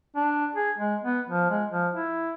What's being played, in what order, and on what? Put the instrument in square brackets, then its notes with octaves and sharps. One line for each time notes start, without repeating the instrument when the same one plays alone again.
[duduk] D4
G#4
G#3
B3
F3
G#3
F3
E4